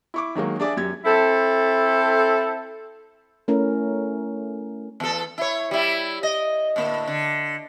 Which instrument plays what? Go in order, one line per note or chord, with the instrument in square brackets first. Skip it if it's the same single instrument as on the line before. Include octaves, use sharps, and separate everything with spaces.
[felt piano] E4 C#6 D6
D#3 F#3 G#3 A#3
D4 G#4 D5 E5
F#2 G4 G#6
[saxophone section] C4 E4 A4
[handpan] A3 C#4 E4 A#4
[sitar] E2 A4
E4 C#5
G3 E4
D#5
A2 D3 A#3
D3